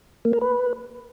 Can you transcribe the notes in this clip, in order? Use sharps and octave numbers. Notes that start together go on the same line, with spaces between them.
A#3
A#4
B4